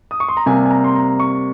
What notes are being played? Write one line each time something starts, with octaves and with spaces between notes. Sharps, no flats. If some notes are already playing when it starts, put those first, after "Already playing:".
D#6
C#6
C6
A#5
C3 G3 A#3 G#5
G#5
A#5
C6
A#5
C#6